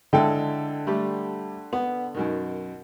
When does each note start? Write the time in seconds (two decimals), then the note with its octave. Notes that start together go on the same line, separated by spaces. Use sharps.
0.13 D3 G#3 E4 A4 G5
0.87 G3 A3 G4
1.73 B3
2.15 F#2 B2 D#3